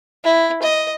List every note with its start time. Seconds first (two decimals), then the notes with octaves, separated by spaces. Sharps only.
0.24 E4
0.62 D#5